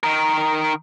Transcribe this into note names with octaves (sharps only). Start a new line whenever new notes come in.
D#3 A#4